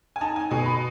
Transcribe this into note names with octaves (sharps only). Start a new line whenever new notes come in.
G#5
D#4 A5
G#5
B2 G#5
B5